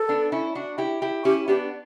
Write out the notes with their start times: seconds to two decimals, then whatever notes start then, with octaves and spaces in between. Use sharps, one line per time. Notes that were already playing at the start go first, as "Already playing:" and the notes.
Already playing: A4
0.09 B3 D4
0.32 C#4 E4
0.55 D4 F#4
0.78 E4 G4
1.02 E4 G4
1.24 C#4 E4 G4
1.48 B3 D4 G4